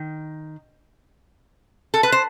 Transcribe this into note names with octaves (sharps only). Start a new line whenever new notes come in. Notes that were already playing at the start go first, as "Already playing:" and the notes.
Already playing: D#3
A4
B4
C5